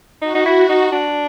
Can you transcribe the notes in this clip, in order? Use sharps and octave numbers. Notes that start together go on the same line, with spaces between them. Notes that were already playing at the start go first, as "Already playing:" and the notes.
D#4 F#4
D#4
E4
D#4
D4